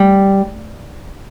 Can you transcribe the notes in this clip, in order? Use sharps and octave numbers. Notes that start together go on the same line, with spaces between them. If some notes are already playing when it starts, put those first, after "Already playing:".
Already playing: G3